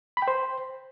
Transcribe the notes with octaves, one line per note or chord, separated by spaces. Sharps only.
B5
G5
C5